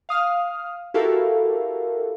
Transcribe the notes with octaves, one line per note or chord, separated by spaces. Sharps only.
F5 D#6 F6
E4 F#4 G4 A4 A#4 F5